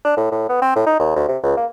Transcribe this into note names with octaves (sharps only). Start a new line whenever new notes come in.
D4
A2
A2
B3
C4
A2
D#4
D#2
D2
C3
C#2
A#3